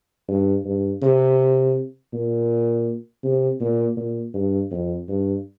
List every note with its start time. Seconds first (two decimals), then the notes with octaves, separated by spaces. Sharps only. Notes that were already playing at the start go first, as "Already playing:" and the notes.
0.28 G2
0.65 G2
1.02 C3
2.13 A#2
3.24 C3
3.61 A#2
3.97 A#2
4.34 G2
4.71 F2
5.09 G2